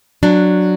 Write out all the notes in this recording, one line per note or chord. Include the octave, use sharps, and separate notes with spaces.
F#3 D4